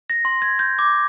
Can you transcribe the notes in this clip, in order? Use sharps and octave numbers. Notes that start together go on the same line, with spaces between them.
A#6
C6
G#6
G6
D6